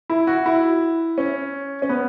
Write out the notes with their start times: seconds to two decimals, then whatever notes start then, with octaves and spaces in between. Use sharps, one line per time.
0.10 E4
0.27 F#4
0.46 E4
1.18 C#4
1.82 C#4
1.89 B3